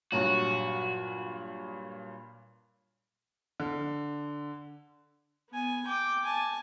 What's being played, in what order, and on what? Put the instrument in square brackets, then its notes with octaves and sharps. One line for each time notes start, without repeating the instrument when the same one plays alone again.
[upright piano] G2 A#2 F#3 [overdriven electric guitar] F#4
[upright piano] D3
[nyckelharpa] B3 G#5
G5 D6
G#5 A5